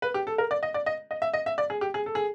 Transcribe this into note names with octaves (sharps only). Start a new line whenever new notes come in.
B4
G4
A4
A#4
D5
D#5
D5
D#5
D#5
E5
D#5
E5
D5
G#4
G4
G#4
A4
G#4